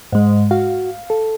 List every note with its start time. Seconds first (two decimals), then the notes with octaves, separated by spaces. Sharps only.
0.12 G#2 G#3
0.51 F#4 F5
1.10 A4